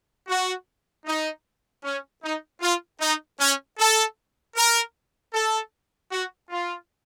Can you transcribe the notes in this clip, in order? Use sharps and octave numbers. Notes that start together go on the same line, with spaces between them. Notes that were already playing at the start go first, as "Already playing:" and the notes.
F#4
D#4
C#4
D#4
F4
D#4
C#4
A4
A#4
A4
F#4
F4